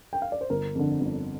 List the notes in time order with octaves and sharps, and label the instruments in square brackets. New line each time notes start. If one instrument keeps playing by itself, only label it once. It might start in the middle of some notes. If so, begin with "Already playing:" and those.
[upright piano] G5
F5
D5
C5
G1 A#4
F2 D3
G1